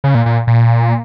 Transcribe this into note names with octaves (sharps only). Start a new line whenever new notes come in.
C#3
A#2
A#2
A#2